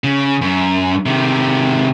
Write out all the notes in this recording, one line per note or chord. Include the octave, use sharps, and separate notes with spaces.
C#3
F#2
C3 D#3